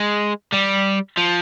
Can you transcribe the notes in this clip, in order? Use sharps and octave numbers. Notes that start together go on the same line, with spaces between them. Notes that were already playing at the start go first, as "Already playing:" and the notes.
Already playing: G#3
G3
F3